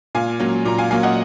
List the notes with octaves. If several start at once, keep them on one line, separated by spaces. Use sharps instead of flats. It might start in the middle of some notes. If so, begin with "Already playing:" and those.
A#2 F5 G#5
F#3 A#3 C#4
A#2 A#5
F5 G#5
F#3 A#3 C#4 F5 G#5
D#5 F#5